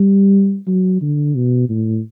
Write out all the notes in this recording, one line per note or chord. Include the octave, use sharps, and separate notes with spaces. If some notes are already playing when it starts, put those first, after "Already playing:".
Already playing: G3
F#3
D3
B2
A2